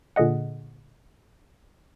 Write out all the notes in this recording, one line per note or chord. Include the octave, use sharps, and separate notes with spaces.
A#2 D3 G#4 D#5 F#5